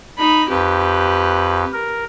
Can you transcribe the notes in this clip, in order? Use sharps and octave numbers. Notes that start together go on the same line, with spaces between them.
D#4 B5
F2 G4 B4
A#4